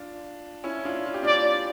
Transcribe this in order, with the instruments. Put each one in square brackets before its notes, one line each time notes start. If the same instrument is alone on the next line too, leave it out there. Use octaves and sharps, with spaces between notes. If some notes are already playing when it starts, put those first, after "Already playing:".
Already playing: [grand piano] D4 F4
C#4 E4
D4 F4
F4
G4
[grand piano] D4 F4 [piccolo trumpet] D5